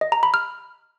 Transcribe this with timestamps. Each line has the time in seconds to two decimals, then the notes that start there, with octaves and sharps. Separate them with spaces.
0.01 D#5
0.12 A#5
0.23 B5
0.34 F6